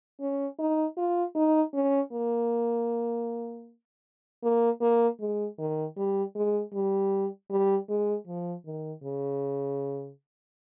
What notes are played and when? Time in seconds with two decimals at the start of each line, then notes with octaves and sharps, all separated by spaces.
0.21 C#4
0.59 D#4
0.97 F4
1.35 D#4
1.74 C#4
2.12 A#3
4.43 A#3
4.81 A#3
5.20 G#3
5.58 D#3
5.96 G3
6.35 G#3
6.74 G3
7.50 G3
7.89 G#3
8.27 F3
8.66 D#3
9.04 C#3